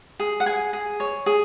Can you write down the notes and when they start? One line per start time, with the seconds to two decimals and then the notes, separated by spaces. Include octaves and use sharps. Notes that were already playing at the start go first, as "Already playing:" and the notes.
0.19 G#4
0.40 F#5
0.46 G#4 G#5
0.73 G#4
1.00 C#5
1.26 G#4